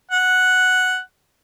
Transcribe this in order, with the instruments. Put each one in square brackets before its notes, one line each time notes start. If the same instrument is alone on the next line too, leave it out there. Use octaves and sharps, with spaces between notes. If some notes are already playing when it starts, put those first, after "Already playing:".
[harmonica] F#5